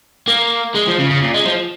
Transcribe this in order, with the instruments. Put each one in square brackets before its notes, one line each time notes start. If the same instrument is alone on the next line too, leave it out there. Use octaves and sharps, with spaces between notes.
[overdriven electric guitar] A#3
G#3
F3
C#3
C#3
A#2
G#3
F3